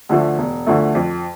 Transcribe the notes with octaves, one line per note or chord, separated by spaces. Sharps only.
D2 D3 F3 A3
E1
D2 D3 F3 A3
F2